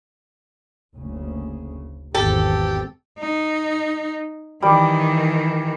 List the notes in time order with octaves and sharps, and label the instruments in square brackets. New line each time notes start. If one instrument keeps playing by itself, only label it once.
[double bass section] F#1 D2 C#3
[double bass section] G#1 E2 C4 [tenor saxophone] G4 [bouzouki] A4
[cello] D#4
[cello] D#3 E3 [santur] G3 D6